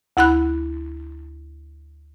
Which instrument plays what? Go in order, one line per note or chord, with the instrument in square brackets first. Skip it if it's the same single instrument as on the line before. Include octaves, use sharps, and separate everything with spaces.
[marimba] D2 E4 F#5 B5 F#6